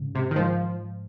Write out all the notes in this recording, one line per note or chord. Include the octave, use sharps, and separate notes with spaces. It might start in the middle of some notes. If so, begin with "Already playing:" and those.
Already playing: G#2 C#3
G#2 C3
D#3
G#2 F3